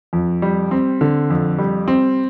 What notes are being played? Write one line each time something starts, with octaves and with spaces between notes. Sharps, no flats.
F2
G3
C4
D3
F2
G3
C4